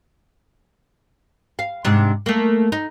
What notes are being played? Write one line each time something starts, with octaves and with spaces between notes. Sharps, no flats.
F5
G#2 C3 D4
A3 A#3
D#4